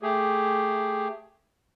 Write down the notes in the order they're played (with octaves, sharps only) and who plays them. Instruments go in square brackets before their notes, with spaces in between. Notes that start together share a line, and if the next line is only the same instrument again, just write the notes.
[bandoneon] A3 G4 G#4